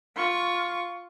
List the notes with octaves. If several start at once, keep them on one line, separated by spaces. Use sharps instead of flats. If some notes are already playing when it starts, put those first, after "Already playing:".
F4 C#6